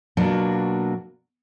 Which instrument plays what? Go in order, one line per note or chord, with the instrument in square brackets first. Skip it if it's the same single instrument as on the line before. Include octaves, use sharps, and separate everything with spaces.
[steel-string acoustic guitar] B2 F#3 A#3 D4 F4 F#4